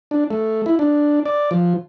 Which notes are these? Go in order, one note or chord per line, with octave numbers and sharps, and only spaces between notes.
D4
A3
E4
D4
D5
F3